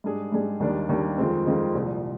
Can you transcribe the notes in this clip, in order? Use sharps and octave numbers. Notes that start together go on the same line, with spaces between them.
G#2 G3 D4 G#4
G#2 G3 D4 G#4
D#2 D#3 G3 D4
D#2 D#3 G3 D4
F2 D#3 G#3 C4 F4
F2 D#3 G#3 C4 F4
C2 A#2 F3